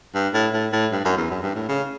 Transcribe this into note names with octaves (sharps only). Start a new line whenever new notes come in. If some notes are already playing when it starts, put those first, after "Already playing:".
G2
A2
A2
A2
G2
F#2
E2
F#2
G2
A2
C#3